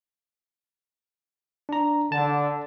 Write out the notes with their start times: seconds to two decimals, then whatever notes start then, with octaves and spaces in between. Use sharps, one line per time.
1.69 D4 A#5
2.12 D3 A5